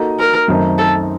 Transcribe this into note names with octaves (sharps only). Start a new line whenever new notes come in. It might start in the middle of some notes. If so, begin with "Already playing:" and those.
Already playing: A#3 D#4 F#4 A4 D#5
A#4
F#2 D#3 A3 C4 D#4
A4